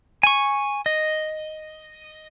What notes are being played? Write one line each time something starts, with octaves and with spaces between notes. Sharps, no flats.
G#5 C#6
D#5